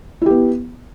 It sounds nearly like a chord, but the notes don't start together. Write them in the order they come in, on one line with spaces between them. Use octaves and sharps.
E4 G4 B3